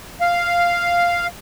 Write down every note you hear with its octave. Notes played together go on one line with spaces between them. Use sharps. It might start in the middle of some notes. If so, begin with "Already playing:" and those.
F5